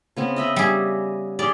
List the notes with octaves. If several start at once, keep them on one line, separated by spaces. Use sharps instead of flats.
C#3 B3 C4
D#5 E5 B5
G3 G#4
G3 G#4 D5 C6